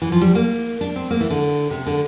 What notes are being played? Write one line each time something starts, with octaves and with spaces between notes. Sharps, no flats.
E3
F3
G3
A#3
D4
C4
A#3
E3
D3
C3
D3